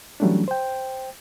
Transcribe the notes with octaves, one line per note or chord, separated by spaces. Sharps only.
E3 F#3 G3 A3 C#4 D4
C5 G5